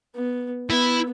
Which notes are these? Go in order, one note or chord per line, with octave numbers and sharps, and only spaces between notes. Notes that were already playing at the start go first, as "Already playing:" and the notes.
B3
B3 E4